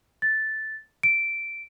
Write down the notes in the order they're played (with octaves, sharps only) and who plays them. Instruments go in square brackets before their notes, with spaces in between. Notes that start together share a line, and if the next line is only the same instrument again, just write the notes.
[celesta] A6
D7